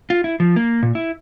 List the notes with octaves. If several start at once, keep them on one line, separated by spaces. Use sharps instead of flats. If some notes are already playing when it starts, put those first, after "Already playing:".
F4
E4
F3
A#3
A#2
E4